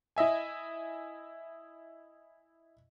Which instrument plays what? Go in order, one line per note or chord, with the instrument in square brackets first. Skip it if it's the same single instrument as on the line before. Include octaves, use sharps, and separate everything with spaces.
[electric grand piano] E4 D#5 E5 G#5